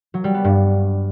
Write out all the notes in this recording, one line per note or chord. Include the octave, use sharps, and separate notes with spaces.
F#3
G3
B3
G2